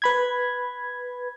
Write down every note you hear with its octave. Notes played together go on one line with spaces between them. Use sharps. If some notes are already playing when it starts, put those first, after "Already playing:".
B4 B5 G#6